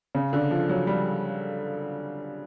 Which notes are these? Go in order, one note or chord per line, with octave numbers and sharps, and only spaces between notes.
C#3
D3
F3
F#3
G3